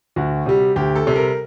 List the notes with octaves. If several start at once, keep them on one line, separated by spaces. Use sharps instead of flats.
D2 F#4
C3 G3
D2 G4
A4
C3 G3
A#4